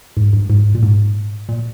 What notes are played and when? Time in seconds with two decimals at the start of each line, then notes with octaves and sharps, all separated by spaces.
0.17 G#2
0.33 G2
0.50 G#2
0.75 A#2
0.83 G#2
1.49 A#2